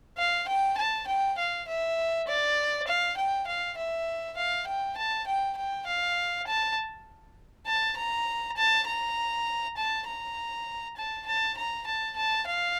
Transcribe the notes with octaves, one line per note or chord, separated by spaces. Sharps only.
F5
G5
A5
G5
F5
E5
D5
F5
G5
F5
E5
F5
G5
A5
G5
G5
F5
A5
A5
A#5
A5
A#5
A5
A#5
A5
A5
A#5
A5
A5
F5